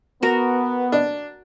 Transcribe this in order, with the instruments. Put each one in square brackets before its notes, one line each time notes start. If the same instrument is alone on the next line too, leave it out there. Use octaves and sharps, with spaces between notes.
[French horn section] B3 [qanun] F#4 A#4
[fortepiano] D4